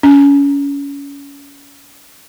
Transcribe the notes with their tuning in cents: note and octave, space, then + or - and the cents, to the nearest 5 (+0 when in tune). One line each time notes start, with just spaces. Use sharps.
C#4 +25